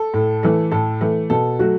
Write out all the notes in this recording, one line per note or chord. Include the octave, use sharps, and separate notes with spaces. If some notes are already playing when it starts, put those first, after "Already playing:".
Already playing: A4
A2
E3 A3
A2 A4
E3 A3
B2 A4
F#3 A3 F#4